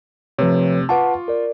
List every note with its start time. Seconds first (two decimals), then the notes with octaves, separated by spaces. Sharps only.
0.39 C3 F3 A3 C4 B4 C#5
0.89 F4 B4 F#5 A5 C#6 D6
1.28 A#4 D5